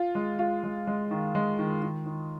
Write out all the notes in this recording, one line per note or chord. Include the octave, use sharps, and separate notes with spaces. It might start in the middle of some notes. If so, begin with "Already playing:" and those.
Already playing: F4
G#3
F4
G#3
G#3
D#3
G#3
D#3
D#3
D#3